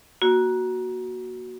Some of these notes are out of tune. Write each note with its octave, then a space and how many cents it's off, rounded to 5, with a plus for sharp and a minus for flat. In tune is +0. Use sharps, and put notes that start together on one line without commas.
A#3 +20 F#4 +0